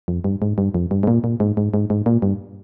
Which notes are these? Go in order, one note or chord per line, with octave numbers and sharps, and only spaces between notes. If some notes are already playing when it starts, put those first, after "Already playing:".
F2
G2
G#2
G2
F2
G2
G#2
A#2
A#2
G#2
G#2
G#2
G#2
A#2
G2